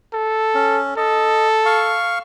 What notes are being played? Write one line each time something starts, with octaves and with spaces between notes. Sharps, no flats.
A4
C#4
A4 D#5
F5 C#6